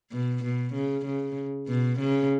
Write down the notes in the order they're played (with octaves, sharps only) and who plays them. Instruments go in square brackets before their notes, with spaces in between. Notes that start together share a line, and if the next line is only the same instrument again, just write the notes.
[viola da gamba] B2
B2
C#3
C#3
B2
C#3